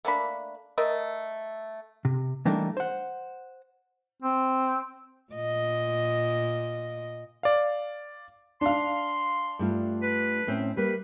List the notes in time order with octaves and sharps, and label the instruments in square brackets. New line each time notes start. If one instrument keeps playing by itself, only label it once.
[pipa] A3 A#3 D4 B5
A3 A#4 D#5
[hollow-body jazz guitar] C3
E3 G3 A3 A#3 D4 D#4
C5 F#5
[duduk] C4
[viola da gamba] A#2 D#5
[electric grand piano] D5 F5
[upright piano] D4 F5 [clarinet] C6
[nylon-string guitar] G2 A3 F4
[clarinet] B4
[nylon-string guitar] A2 C4 C#4
[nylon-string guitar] G3 A#3 [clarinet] B4